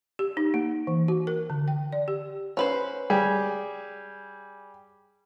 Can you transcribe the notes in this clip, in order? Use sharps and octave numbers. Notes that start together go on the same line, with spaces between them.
G4
D#4
A#3
E3
F#4
A#4
D3
G5
D5
G4
C#4 B4 C5
G3 G#4